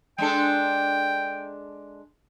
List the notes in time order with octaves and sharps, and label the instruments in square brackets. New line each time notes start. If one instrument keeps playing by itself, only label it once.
[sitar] G#3 D4 A4 [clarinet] G5